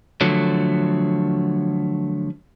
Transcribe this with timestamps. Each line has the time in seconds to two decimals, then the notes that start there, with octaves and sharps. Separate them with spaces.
0.21 D3 F3 F#3 A3